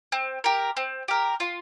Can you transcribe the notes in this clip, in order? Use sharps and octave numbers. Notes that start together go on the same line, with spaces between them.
C4
G4 A#4
C4
G4 A#4
F4